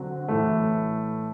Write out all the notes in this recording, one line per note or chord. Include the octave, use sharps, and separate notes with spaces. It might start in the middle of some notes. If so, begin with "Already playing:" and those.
Already playing: D3 F#3 C4 F#4
A2 E3 A3